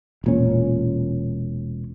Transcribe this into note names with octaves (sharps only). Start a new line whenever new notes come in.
E1 A#2 C#4